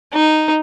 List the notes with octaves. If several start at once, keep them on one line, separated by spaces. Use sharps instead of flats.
D#4